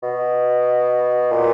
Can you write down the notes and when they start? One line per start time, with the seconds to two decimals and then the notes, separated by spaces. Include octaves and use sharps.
0.03 B2
1.31 A#2